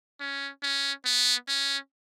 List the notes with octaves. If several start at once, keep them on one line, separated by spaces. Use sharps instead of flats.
C#4
C#4
B3
C#4